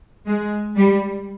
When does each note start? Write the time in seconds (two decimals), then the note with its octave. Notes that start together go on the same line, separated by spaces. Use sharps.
0.27 G#3
0.76 G3